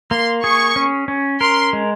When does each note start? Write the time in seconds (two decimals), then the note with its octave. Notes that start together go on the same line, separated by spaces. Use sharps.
0.11 A#3 C6
0.44 G#4 C#6
0.76 C#4
1.08 C#4
1.41 A#4 C6
1.73 G#3